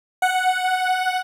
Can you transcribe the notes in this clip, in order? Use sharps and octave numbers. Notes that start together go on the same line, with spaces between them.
F#5